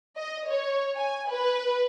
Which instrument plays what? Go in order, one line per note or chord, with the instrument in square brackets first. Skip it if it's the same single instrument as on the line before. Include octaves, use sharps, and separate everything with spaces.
[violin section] D#5
C#5
G#5
B4